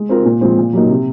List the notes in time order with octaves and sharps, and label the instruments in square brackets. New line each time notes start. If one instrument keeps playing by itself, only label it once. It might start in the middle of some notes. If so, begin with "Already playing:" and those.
Already playing: [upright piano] G#3
C4 F4 A#4
A#2
F3 G#3 C4
A#2
F#3 A#3 D#4
C3